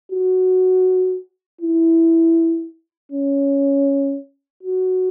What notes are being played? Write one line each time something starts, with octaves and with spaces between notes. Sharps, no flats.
F#4
E4
C#4
F#4